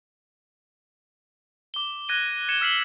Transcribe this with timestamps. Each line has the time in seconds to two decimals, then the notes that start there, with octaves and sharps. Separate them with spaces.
1.74 D6 G7
2.09 F#6 G#6 A#6 D#7 G7
2.49 G#6 C#7 E7 G7
2.61 E6 F6 B6 C7 F#7 G7